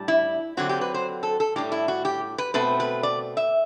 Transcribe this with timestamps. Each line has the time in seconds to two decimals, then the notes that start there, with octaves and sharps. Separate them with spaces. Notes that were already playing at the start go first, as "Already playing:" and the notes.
Already playing: A2 G3 D4
0.08 E4
0.57 D3 F#3 C4 F#4
0.69 G4
0.81 B4
0.94 C5
1.23 A4
1.40 A4
1.56 A2 G3 D4 G4
1.72 E4
1.88 F#4
2.05 G4
2.38 B4
2.54 B2 A3 C4 B4
2.80 B4
3.03 D5
3.37 E5